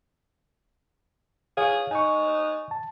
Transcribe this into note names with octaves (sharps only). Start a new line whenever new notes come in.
G#4 C#5 F5
D#4 G#5 C#6
A5